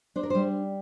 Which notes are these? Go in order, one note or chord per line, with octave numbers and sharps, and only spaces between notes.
D4 C5
A#4
G3 C5